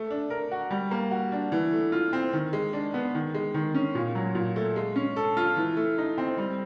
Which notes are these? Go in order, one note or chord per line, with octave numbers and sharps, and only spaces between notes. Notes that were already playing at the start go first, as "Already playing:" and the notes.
Already playing: A3
D4
A#4
F#4
G3
A#3
F#4
D4
E3
A3
F4
C4
D#3
G#3
D4
B3
D#3
G#3
D#3
C#4
A#2
F#3
A#2
A3
G#3
C#4
A4
F4
E3
A3
D#4
C4
G3